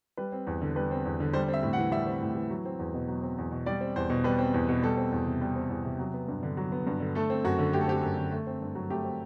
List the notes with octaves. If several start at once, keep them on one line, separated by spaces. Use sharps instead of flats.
G3 B4
C4
E2
D3
G3 B4
C4
E2
D3
G3 C5
C4
E5
A2
F#5
E3
G3 E5
C4
A2
E3
F#3
C4
E2
B2
F#3
C4
E2
B2
G3 D5
C4
E2 C5
B2
G3 B4
C4
E2
B2
G3 A4
C4
E2
C3
G3
C4
E2
C3
F#3
B3
G2
D3
F#3
B3
G2
D3
A3 A4
C4
F#2 F#4
D3
A3 G4
A4
C4 G4
F#2
D3
A3
C4
G2
F#3
A3 G4
C4